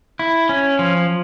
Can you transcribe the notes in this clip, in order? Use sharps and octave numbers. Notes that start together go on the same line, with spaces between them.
E4
C#4
F3